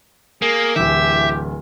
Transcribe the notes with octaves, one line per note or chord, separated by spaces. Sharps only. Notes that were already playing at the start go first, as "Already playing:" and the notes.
A#3 G#4
D1 E3 G4 E5